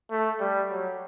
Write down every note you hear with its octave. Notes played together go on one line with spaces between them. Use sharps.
A3
G3
F#3